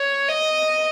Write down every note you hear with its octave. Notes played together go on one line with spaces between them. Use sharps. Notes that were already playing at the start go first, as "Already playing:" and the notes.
Already playing: C#5
D#5